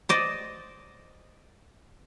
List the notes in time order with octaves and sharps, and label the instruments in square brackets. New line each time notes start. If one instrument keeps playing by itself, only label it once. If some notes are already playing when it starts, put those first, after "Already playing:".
[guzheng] C5 D5 D#5